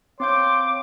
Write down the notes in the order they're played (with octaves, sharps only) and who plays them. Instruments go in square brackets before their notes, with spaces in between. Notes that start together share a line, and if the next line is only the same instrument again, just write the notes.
[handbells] C4 F5 G6 [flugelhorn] C#5 [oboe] C6 [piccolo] D6